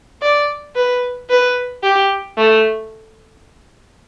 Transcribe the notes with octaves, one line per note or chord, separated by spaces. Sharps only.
D5
B4
B4
G4
A3